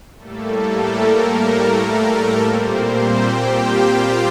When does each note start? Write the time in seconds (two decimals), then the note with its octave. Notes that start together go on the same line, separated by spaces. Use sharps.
0.17 A2 G3 A3 A#3 A4
0.73 A#3 A#4
1.29 A3 A4
1.85 A3 A4
2.41 A#2 G3 A#3 C4 C5
2.97 G4 G5
3.52 F4 F5